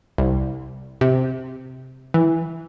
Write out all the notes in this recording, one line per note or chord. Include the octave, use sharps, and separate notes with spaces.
C2
C3
E3